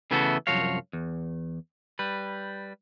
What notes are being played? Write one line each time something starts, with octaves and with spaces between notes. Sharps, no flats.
C#3 E3 A3 B3 F#4 A4
C2 F#2 F3 F#4 C#5 F5
E2
G3 B4